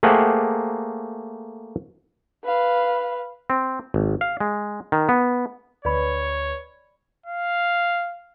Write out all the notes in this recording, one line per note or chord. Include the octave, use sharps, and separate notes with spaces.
A3 A#3 G4 G#4 C5 F#5
B4 F5
C4
G#1
F5
G#3
D#3
B3
D2 B4 C#5 D5 B5
F5